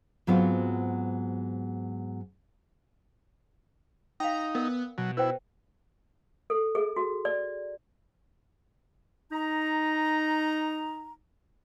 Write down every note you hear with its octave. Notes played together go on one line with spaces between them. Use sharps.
G#2 F#3 B3 C4 F4 F#4
D#4 F5 G5 A#5
B3 A#4 D5
B2 F#3
E4 B4 C5 G5
A4
G#4
F#4
D5
D#4 A#5